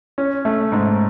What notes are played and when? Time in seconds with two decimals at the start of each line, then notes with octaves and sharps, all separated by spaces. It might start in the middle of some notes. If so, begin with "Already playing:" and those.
0.18 C#4
0.45 A3
0.72 G#2